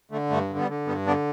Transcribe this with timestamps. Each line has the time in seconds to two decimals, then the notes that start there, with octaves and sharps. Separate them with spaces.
0.11 D3 A3
0.30 G2 A3
0.50 D3
0.58 G3 B3
0.68 D3
0.87 G2 G3 B3
1.07 D3 B3 D4